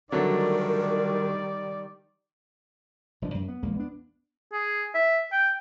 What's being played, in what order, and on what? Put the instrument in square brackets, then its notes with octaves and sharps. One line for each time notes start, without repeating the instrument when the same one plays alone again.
[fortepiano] D3 F#3 A3 [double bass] D#3 G3 [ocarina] A#4 [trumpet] D5
[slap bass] F1 G2 F3 D4
F#2
B3
A#1 E2 G#3 A#3
B3 D4
[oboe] G#4
E5
G5